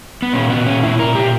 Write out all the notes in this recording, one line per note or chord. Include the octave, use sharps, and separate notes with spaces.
B3
A#2 C#4
B3
C#4
E4
A#4
G4